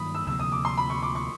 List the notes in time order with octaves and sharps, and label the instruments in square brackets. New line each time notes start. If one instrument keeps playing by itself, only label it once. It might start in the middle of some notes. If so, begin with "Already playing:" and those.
Already playing: [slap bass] G2 D#3 F#3 A#3 [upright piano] B5 D#6
[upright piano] E6
[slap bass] D2 C3 F3 A#3 [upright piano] E6
[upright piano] D#6
D6
C6
B5
C#6
D6
C#6